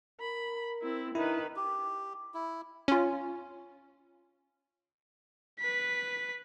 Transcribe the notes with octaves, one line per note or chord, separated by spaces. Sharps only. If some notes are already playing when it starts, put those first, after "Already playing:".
A#4 B5
C4 E4
D#3 D4 E4 B4
G4
E4
C#4 F4
B4 B6